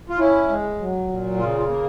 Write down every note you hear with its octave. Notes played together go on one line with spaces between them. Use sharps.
F4
C#4 E4
G#3
F#3
A#2
C#3 F4
F4
A#3